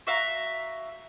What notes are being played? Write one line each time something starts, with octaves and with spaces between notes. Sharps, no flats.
F#4 E5 F5 A#5